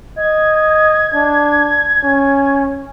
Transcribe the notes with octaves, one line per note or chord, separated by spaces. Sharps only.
D#5 G#6
D4
C#4